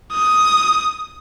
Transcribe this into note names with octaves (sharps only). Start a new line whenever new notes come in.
D#6